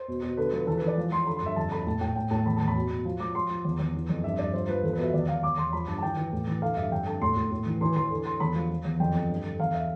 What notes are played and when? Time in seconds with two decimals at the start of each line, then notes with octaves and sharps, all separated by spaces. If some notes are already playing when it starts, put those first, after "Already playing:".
Already playing: C5
0.08 B2
0.23 B2
0.37 D3 B4
0.52 F3 B4
0.67 E3 A4
0.77 B4
0.82 E3
0.88 D5
0.97 F3
1.11 F3 C6
1.27 D3 B5
1.36 C6
1.42 G2 E5
1.56 F2 A5
1.72 D3 B5
1.86 A2 A5
2.01 A2 G5
2.16 A2 G5
2.31 A2 A5
2.46 E2 B5
2.57 E2 A5
2.67 B5
2.76 B2
2.90 B2
3.05 F3
3.20 F3 D6
3.35 F3 C6
3.50 F3
3.65 E2
3.80 E2
3.94 E3
4.09 F2
4.24 G2 E5
4.39 G2 D5
4.54 F3 C5
4.69 F3 B4
4.83 E2 A4
4.93 B4
4.99 B2 E5
5.13 E2 D5
5.28 E2 F5
5.43 E2 D6
5.58 E2 C6
5.73 F3 B5
5.88 G2 A5
5.98 A5
6.03 E3 G5
6.17 E3
6.32 A2
6.47 E3
6.62 D3 F5
6.77 G2 E5
6.91 F2 G5
7.06 D3 A5
7.21 A2 C6
7.36 A2
7.51 A2
7.66 E3
7.81 E3 C6
7.96 E3 C6
8.11 D3
8.25 D3 C6
8.40 E2 B5
8.55 F3
8.70 F3
8.85 E2
9.00 F2 G5
9.15 F2
9.29 G2
9.44 D3
9.60 E2 F5
9.74 E5